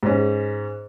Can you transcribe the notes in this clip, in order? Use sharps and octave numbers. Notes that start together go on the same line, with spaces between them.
G#2 C#4